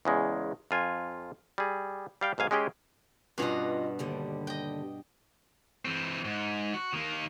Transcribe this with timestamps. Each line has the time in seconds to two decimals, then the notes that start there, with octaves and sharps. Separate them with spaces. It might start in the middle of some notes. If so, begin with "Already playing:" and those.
0.05 E2 C#3 G#3
0.71 F2 F4 G#5
1.58 G3 G#4
2.21 G3 F5 G5
2.38 B1 G#2 F5 G#5
2.51 G#3 C#4 G4 G#4 G5
3.38 G2 B2 C#4 F4 D#5
3.99 D#2 D3 G3
4.47 D#5 G5
5.85 E3 C4
6.25 G#2
6.74 F#4
6.93 D#3 A#3